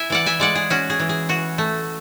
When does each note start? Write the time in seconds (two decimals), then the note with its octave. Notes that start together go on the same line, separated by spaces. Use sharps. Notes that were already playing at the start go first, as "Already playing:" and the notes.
Already playing: E4 E5 G#5
0.10 E3 D5 F#5
0.26 E5 G#5
0.40 G#3 D5 F#5
0.55 G#4
0.70 C#4 F#4
0.90 G#4
1.00 E3
1.09 G#4
1.29 E3 F#4
1.58 A3